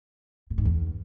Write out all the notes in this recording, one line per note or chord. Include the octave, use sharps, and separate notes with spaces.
A2
G#2
E2